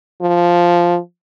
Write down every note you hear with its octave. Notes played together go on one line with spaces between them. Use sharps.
F3